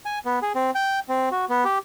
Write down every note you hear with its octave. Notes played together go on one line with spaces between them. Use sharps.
G#5
B3
G#4
C4
G5
C4
F#4
B3
G4